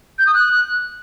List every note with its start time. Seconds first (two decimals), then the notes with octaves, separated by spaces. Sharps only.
0.19 G6
0.27 D#6
0.34 F#6